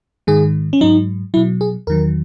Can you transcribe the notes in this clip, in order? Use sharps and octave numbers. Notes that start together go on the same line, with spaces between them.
G#2 D#3 G#3 G#4
C#4
G#2 F#3 D#4
B2 F#3 E4
G#4
E2 D#3 F#3 A#4